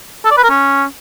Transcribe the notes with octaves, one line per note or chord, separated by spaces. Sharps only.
A4
D5
B4
A#4
C#4